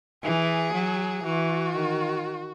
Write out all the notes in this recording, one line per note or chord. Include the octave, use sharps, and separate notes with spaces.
E3 G#4
F#3
E3 F#4
D#3